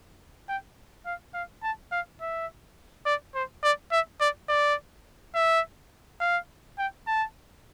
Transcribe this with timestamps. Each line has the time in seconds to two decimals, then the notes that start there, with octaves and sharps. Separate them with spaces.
0.49 G5
1.06 F5
1.34 F5
1.63 A5
1.92 F5
2.21 E5
3.06 D5
3.35 C5
3.63 D5
3.92 E5
4.20 D5
4.49 D5
5.35 E5
6.21 F5
6.78 G5
7.07 A5